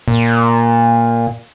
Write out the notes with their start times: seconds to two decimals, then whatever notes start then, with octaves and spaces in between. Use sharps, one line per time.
0.08 A#2